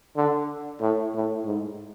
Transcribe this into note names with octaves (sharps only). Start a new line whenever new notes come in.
D3
A2
A2
G#2